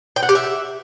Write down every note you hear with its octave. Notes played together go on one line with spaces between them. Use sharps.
G5
F#5
G4
E5